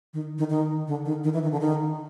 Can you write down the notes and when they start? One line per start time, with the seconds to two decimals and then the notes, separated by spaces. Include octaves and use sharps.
0.13 D#3
0.38 D#3
0.50 D#3
0.88 D3
1.05 D#3
1.24 D#3
1.33 E3
1.43 D#3
1.52 D3
1.61 D#3